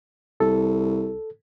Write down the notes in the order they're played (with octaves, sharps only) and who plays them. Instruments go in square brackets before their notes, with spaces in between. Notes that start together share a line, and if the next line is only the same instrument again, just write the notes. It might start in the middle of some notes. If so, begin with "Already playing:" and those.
[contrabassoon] C2 [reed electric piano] A4